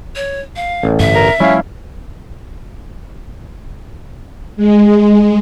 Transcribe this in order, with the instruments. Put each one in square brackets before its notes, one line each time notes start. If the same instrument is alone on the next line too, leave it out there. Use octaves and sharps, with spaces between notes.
[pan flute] C#5
F5
[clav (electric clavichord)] A1
[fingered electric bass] G2 D3 [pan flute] E5
[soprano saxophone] A#4
[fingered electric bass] F3 G3 A3 [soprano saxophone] C#4 [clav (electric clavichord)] E4 F5
[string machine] G#3